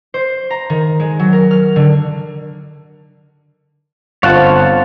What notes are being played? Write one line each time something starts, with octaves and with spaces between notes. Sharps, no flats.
C5
A#5
D#3
G#3
F#3
A#4
F6
D3
G1 C4 F4 C#5 F5 F#5 A5